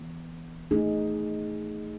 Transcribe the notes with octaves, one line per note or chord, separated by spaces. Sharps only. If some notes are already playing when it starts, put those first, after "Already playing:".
Already playing: E3 B3
A3 D#4 G#4